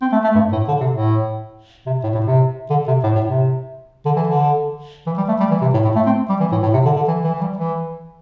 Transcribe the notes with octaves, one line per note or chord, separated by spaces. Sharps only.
C4
A3
A3
G2
A2
D3
C3
A2
C3
A2
A2
C3
D3
C3
A2
A2
C3
D3
E3
D3
E3
G3
A3
G3
E3
C3
A2
A2
A3
C4
G3
E3
A2
A2
C3
D3
D3
E3
E3
E3
G3
E3